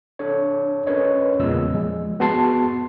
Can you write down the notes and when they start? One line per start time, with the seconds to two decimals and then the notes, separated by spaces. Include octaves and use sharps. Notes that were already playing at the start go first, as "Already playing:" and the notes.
0.19 D4 A4 C#5
0.86 C#4 A#4 B4 C#5 D#5
1.40 E2 A#2 C#3 G#3 D#5 E6
1.74 F3 G#3
2.20 B3 F#4 G#4 A5 C6 C7